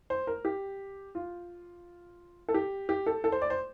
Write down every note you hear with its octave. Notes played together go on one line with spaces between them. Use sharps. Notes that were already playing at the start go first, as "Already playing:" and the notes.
C5
A#4
G4
F4
A4
G4
G4
A4
A4
C5
D5
C5